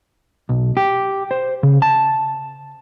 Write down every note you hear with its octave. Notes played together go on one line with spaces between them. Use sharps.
B1
G4
C5
C#3
A5